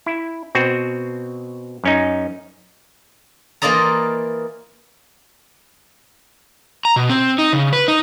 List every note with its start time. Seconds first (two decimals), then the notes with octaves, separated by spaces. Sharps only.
0.06 E4
0.55 B2 C4 F#4
1.84 F#2 C#4 D#4
3.62 E3 A#3 F4 D5 D#5 A#5
6.85 A#5
6.96 B2
7.10 C4
7.38 D#4
7.53 C#3
7.73 B4
7.88 D#4